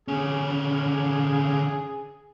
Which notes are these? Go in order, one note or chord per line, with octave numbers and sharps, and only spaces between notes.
D3 C#4 G#4